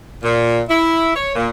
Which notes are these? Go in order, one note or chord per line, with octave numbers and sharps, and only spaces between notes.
A#2
E4
C#5
A#2